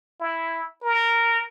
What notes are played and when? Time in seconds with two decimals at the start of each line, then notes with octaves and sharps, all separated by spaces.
0.20 E4
0.82 A#4